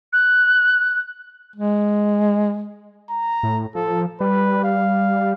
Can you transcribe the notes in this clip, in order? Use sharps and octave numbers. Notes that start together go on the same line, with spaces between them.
F#6
G#3
A#5
A2
F3 A4
G3 B4
F5